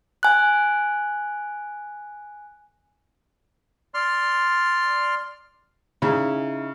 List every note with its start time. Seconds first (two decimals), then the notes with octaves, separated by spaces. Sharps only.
0.23 G#5 F#6
3.94 D5 C6 F6
6.02 C#3 D#4 E4 G#4